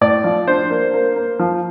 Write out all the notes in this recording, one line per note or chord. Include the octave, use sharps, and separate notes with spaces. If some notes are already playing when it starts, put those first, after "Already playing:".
A2 D5
F3
D4 C5
A#3
A#3
A#3
F3